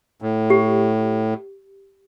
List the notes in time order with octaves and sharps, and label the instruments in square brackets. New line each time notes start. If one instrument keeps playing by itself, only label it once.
[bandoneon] A2
[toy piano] G4